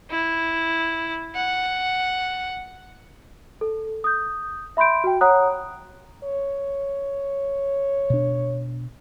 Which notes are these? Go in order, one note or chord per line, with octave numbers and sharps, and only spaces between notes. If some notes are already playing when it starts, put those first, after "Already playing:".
E4
F#5
A4
D#6 G6
E5 B5 C6 G6 D7
F#4 G5
C#5 F#5 A#5 D#6 F#6
C#5
B2 D4